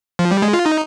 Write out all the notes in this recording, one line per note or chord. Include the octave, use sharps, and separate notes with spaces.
F3
G3
G#3
F4
D#4